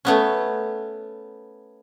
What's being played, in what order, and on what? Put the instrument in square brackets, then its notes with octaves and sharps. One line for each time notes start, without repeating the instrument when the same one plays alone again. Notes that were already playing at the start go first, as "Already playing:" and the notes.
[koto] A3 B3 C#4